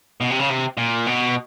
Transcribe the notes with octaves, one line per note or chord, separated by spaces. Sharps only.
B2
C3
C#3
C3
A#2
B2